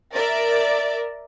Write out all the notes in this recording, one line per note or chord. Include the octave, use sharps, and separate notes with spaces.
A#4 D5 E5